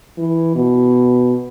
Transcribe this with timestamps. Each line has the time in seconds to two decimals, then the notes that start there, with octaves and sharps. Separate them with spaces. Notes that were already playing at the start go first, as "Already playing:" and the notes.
0.18 E3
0.55 B2